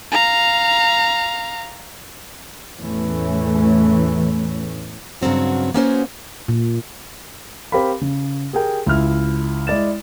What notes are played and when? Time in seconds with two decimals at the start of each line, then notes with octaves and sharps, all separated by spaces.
0.12 F5 A#5
2.77 E2 A2 E3 A3 C#4
5.22 G2 C#3 F#3 C4 F#4
5.74 A#3 B3 C#4 F#4 G#4 C5
6.48 A#2
7.72 C4 G4 A#4 F5 B5
8.01 C#3
8.53 G4 G#4 A#4 G5
8.86 C#2 E4 F6
9.67 G#3 E4 D5 A6 E7